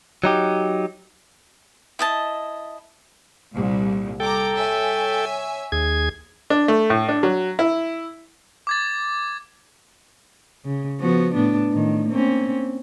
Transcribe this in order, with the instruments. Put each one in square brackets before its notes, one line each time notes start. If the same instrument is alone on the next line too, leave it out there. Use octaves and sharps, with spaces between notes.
[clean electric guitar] F#3 D#4 G4
[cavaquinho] E4 D#5 A5
[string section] C2 A#2
[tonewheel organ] A4 G5 [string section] A#5 D6
[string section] C#5 E5 G#5
[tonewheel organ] D#2 G#4 G#6
[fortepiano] D4
A3
A2
D4
F#3
E4
[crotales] D6 G#6 A6
[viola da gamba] C#3
F3 B3 F#4
A2 B3 D4
A2 D#3
A#3 C4 C#4